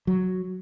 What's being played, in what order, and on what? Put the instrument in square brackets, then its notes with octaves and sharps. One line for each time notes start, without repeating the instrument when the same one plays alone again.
[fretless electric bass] F#3